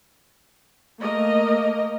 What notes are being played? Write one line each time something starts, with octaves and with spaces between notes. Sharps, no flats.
A3 A#3 A#4 D#5